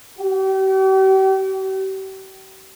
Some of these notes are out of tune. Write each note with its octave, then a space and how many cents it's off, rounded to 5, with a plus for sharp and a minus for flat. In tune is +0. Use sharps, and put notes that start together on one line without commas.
G4 -40